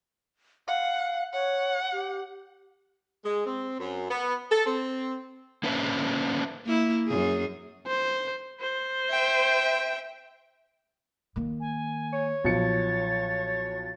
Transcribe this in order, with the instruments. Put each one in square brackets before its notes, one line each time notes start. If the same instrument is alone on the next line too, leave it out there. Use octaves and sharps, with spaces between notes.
[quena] F5 [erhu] F#5
[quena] C#5 [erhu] F#5
[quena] G4
[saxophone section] G#3
C4
F#2
B3
A4
C4
[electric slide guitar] A#3 C#4 D4 B4 C5 E5
[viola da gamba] A#3 E4
F#2 G#4
[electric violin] C5
[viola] C5
[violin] E5 G5
[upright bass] D#3 A#3
[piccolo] G#5
[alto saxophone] C#5
[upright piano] B1 F3 C#7 [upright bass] A#2 [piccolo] A6